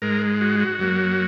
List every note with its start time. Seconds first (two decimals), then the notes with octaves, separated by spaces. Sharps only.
0.02 G#2 G#3 A#4
0.41 F#4
0.60 F#4
0.79 F#2 F#3 A#3